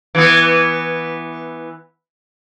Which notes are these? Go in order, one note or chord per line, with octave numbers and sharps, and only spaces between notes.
E3 B3